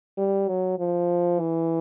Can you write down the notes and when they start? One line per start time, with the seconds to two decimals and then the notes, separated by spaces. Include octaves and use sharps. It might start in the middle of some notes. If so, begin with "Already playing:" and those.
0.18 G3
0.49 F#3
0.79 F3
1.40 E3